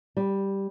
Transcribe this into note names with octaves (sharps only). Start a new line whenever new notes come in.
G3